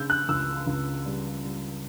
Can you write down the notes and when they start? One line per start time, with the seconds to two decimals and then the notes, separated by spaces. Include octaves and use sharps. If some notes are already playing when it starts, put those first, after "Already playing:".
Already playing: C#3 E6 G6
0.10 F#6
0.29 C#2 E6
0.67 C#2
1.06 G3
1.44 G3